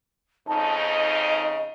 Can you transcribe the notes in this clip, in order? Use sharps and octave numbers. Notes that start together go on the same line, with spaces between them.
F2 C#3 D#4 A5
D#5